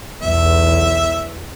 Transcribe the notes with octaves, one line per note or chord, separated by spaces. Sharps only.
B1 E2 E5